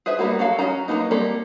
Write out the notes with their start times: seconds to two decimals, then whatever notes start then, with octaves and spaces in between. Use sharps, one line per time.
0.06 G#4 B4 C5 E5
0.19 G3 A#3 B3 F#4
0.39 F#3 F#4 A4 F5
0.59 F#3 C#4 F#4 A#5
0.88 F#3 G#3 A#3 B3 D#4
1.11 G3 A#3 C4 A4